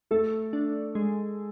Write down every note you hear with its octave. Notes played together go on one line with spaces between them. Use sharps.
A3 A4
D4
G#3